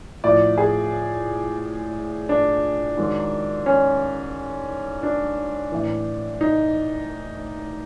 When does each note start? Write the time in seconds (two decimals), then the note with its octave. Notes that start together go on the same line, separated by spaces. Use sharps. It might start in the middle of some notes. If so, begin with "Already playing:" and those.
0.24 A2 F3 D5
0.58 G#4
2.29 D4
2.97 G#2 D#3 F#3
3.66 C#4
5.03 D4
5.72 A2 E3
6.41 D#4